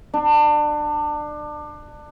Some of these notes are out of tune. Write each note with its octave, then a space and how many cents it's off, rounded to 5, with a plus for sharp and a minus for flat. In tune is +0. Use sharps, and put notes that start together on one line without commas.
D4 +25